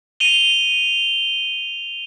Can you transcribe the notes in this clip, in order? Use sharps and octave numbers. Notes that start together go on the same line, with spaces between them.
D#7 F7 G7